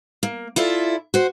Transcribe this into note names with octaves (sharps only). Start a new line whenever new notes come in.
A#3
E4 F4 A4 D5
F#4 C5